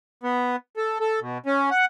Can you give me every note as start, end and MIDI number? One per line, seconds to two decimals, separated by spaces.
0.23 0.56 59
0.77 0.98 69
1.00 1.20 69
1.21 1.38 47
1.46 1.70 61
1.71 1.85 78